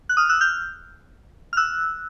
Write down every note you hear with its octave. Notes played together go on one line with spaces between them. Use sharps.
F#6
D#6 F6
E6 F#6
F6 G6
F6
E6 F#6